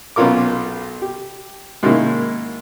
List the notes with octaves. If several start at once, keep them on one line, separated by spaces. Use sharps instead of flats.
B1 B3 C#4 F4 A#4 D6
G4
G#2 D#3 A#3 C#4 E4